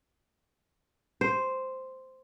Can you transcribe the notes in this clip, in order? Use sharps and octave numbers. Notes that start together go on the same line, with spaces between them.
C5